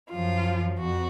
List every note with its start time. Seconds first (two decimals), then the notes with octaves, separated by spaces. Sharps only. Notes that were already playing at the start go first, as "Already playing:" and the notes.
0.12 F#2 F3 F4
0.79 F2 F#4